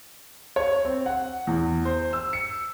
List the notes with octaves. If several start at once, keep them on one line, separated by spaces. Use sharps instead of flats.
C#5
C4
F#5
E2
C5
E6
C#7